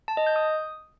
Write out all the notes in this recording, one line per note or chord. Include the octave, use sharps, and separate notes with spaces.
A5
D#5
G6
D#6